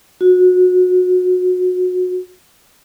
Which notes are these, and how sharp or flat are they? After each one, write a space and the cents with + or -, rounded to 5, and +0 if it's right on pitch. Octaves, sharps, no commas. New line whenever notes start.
F#4 -25